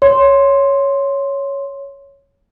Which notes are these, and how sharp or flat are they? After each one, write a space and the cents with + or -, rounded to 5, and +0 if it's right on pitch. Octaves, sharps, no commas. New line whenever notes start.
C#5 +0 C6 +0